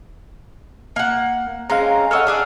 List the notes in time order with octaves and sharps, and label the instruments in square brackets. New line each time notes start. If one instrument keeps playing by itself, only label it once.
[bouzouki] A#3 F#5
[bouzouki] G#3 C4 C#4 [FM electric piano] F5 A#5
[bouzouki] A4 C#5 D#5 [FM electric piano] F#5 E6 F6
[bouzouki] D4 G#4 D5